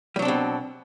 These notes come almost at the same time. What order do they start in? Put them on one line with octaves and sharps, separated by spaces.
G3 F#3 D4 C4 B2